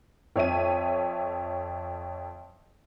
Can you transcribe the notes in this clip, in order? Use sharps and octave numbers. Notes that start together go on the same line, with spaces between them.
F2 C#5 E5 D#7